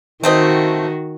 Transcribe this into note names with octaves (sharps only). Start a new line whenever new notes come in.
D#3 A3 C4 F#4 D#5